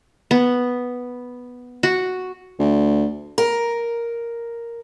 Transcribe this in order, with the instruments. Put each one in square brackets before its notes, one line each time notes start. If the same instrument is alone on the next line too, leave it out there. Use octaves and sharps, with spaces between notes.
[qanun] B3
F#4
[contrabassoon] D2
[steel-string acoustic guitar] A#4